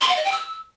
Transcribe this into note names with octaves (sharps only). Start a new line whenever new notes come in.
C6
F#5
D#5
G5
E6